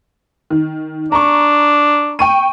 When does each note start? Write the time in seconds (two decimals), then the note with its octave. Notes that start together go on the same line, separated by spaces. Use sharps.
0.50 D#3
1.12 D4 A#5 C#6
2.19 G5 C#6 D#7